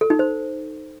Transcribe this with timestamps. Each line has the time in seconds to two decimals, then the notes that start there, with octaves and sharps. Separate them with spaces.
0.01 A4
0.10 D#4
0.19 C5